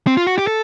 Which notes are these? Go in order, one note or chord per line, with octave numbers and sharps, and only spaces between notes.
C4
F4
F#4
G4
A4